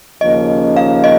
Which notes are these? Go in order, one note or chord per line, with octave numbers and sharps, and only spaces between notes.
D#2 C#3 F3 A#3 C#4 D#5
F5
D#5